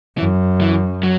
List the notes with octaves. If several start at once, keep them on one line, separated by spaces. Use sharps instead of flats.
F#2 E3
E3
F#3